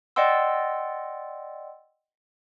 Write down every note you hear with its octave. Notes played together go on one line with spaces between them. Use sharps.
D5 D#5 F#5 G5 C6 E6